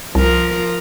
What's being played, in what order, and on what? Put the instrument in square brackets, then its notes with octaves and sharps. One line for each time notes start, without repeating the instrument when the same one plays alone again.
[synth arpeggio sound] C2 [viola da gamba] F3 A#4